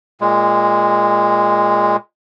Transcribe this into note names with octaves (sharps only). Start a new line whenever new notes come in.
A#2 G#3